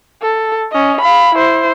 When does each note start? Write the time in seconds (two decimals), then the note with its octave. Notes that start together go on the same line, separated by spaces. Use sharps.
0.22 A4
0.72 C#4 D#5
1.01 F5 B5
1.34 E4 C5